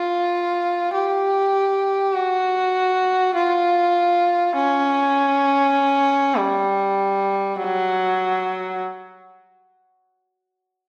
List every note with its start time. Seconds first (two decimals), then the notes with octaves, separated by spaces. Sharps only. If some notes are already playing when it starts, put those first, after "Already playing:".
Already playing: F4
0.93 G4
2.14 F#4
3.35 F4
4.55 C#4
6.37 G3
7.57 F#3